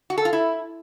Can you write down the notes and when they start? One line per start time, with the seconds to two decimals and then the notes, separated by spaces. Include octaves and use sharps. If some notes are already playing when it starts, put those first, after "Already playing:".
0.10 F#4
0.18 A4
0.25 F4
0.33 E4